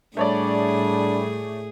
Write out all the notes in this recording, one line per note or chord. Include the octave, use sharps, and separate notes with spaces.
A2 G3 A3 D4 G#4 C#5 D5